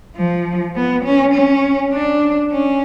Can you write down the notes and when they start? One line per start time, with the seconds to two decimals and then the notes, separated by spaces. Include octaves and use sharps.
0.16 F3
0.75 B3
1.04 C#4
1.34 C#4
1.93 D4
2.52 C#4